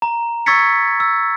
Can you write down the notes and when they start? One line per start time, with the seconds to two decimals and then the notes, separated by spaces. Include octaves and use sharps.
0.02 A#5
0.46 C#6 E6 G#6 A6 B6 C#7
1.00 E6